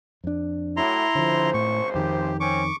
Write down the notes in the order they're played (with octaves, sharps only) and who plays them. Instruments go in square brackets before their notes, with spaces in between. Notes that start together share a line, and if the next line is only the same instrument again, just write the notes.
[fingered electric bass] F2 D4
[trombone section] A2 F#3 [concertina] E4 A#5 C6
[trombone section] G#1 C#2 C5 [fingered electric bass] D3 F3
[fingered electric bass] A2 [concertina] C#6
[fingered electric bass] F2 D#3 [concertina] G4
[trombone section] C4 C#4 [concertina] C#6 D6